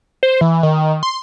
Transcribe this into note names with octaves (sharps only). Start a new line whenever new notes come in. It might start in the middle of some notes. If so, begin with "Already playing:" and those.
C5
E3
D#3
C6